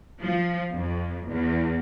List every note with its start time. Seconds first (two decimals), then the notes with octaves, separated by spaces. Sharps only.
0.20 F3
0.73 F2
1.28 E2